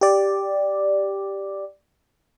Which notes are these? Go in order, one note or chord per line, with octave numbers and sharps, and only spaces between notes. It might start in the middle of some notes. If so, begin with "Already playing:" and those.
G4 D5